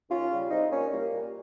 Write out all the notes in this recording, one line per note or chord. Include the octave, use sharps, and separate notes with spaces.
D#2 C#4 F4
C#3 G3
C2 C4 D#4
A#2 G3 A#3 C#4
C2 A#3
A#2 G3